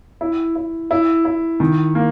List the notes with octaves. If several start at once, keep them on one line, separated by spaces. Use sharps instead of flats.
E4
E4
E4
E4
D#3
A#3